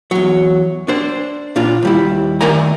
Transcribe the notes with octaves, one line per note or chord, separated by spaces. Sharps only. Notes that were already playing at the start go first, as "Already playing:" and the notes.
E2 F#3
D4 C5
A#2 D4 F4
D#2 G3 E4
D#3 A3 A#4 D5 G#5 A#5